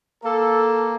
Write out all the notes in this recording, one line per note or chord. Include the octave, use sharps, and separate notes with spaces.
A#3 A4